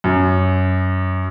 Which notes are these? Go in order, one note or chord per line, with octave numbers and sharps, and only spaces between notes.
F#2